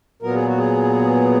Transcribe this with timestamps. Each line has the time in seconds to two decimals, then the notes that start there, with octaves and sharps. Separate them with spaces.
0.23 A#2 F#3 B3 A#4
0.35 G#4
0.47 F#4
0.58 G#4